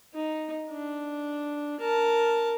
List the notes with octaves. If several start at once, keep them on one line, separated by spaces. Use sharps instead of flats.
D#4
D4
A#4 A5